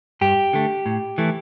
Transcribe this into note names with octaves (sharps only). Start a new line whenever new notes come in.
G2 G4
D3 A3
A2
E3 A3